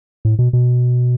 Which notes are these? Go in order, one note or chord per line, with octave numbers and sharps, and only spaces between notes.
A2
B2
B2